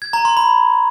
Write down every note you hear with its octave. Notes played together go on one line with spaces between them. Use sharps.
G#6
A#5
C6
B5